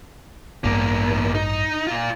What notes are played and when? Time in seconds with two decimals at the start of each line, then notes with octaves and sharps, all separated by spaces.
0.64 A1 E2 G2 A#3
1.35 D#4
1.87 A#2 F4